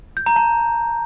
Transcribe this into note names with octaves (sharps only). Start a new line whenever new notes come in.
G6
A#5
A5